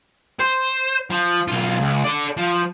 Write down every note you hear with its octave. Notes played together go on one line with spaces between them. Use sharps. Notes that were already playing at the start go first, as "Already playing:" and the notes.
C5
F3
B1 F4
C#2
A4 D5
F3